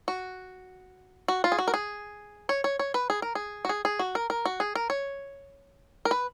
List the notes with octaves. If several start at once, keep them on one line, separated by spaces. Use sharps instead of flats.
F#4
F#4
F4
G#4
F#4
A#4
G#4
C#5
C#5
C#5
B4
G#4
A#4
G#4
F#4
G#4
G#4
F#4
A#4
A#4
F#4
G#4
A#4
C#5
A#4
B4